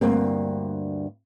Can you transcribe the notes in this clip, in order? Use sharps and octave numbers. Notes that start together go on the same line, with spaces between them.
D2 G2 A#3 C4